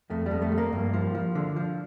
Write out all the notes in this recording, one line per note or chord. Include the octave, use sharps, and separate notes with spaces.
F2 A3
G3
F2
A3
F2
A#3
G2
F3
F3
D3
F3